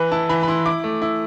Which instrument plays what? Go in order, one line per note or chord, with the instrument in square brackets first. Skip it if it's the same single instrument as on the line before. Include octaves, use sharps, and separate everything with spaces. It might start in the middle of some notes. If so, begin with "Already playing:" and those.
Already playing: [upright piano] E3 B4
E4 A5
E3 B5
B5
E4 C6
E4 D6
A3
E4